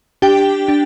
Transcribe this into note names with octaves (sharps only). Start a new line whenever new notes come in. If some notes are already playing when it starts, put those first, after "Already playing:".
D4 G4 G5
D4